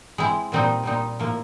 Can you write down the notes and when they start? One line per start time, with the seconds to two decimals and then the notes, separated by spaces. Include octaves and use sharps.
0.18 G#3 C4 E4
0.52 A#2 G3 C4 D#4
0.83 A#2 G3 C4 D#4
1.19 A2 F3 A#3